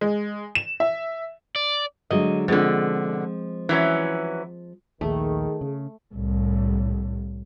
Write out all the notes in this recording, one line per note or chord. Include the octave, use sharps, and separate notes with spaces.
G#3
E7
E5
D5
D3 F#3 G#3 D#5
B2 D3 F3 G#3 C4
E3 F#3 C#4
A#1 D#2 D#3 A3 G#4
C#3
C2 A2